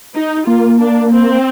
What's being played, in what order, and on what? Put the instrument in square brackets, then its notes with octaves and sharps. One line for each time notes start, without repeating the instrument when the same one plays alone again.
[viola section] D#4
[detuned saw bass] A#3 [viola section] F4
[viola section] D4
C4